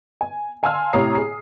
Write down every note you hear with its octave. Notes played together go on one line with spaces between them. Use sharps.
G#5
F5 G#5 A5 C6 E6 F6
A2 C3 C#5 A#5 D#6 C7
G#4 C7